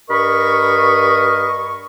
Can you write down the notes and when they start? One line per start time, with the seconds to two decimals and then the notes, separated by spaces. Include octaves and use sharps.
0.09 G2 A#4 D#5 B5 C#6